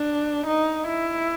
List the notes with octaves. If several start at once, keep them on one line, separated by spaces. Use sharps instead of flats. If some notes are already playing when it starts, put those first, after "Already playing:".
Already playing: D4
D#4
E4